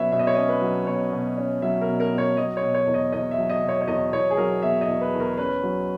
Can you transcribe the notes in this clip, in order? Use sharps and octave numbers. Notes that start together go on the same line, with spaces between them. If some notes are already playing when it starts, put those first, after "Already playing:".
Already playing: B2 F#3 C#4 B4 C#5 E5
B2 E5
D#5
C#5
C#4 D#5
B4
F#3
B2 C#5
B2
C#4
F#3 E5
A#4
B2
A#4
B2
C#5
F#3 D#5
C#5
B2
C#5
E2
D#5
E2 D#5
E5
F#3
D#5
B2
C#5
C#5
E2 D#5
E2 C#5
G#4
F#3 A#4
B2 E5
D#5
E2
B4
E2
A#4
C#4 B4
F#3